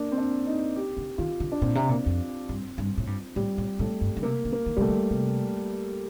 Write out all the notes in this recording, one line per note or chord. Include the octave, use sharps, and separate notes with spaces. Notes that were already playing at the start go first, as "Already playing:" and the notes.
Already playing: A#3 D4
C4
D4
D#4
G4
D3
D#3 F4
D3
D4
A#2 C4
C3
A#2
F2
G2
G2
A2
G2
A2 G3
A2
A2 A3
G2
D3
C3 A#3
D3
A#3
D#3
C3 G3 A3
D3
C3